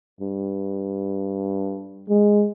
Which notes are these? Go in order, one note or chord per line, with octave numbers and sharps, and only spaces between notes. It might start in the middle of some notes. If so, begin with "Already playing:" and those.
G2
G#3